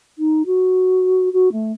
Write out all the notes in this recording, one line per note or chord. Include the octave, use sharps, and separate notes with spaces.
D#4
F#4
F#4
A3